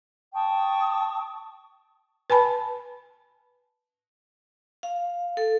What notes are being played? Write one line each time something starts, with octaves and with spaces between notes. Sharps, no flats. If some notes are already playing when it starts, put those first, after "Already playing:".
G5 A5 C#6 D#6
B4 G#5 A5 B5
F5
A4